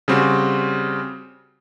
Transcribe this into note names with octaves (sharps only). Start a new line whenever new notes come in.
C#3 G3 C4 F#4